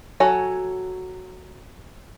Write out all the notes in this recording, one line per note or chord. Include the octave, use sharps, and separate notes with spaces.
F#3 F#4 A4 C#5 G#5